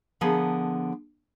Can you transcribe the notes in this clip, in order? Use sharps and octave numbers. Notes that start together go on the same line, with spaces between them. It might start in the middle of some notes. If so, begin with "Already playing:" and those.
D3 F3 B3 G#4 A#4